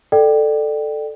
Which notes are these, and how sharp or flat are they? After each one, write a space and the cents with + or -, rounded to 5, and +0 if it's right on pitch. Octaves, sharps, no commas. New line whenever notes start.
A4 +0 D5 +25 G5 -10